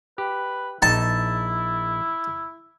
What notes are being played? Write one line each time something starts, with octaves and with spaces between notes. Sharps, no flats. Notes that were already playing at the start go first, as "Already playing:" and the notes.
G4 B4
A#1 D#4 E4 A5